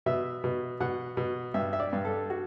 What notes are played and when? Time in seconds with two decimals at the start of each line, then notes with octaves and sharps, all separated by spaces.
0.06 B2 E5
0.44 B2
0.80 B2 F#5
1.17 B2
1.54 G2 E5
1.73 E5
1.80 D5
1.93 G2
2.05 A4
2.30 F#4